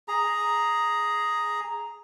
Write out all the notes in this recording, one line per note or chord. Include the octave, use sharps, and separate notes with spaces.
G#4 A#5